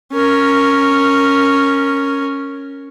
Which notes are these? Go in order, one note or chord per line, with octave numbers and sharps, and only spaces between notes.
C#4 A#4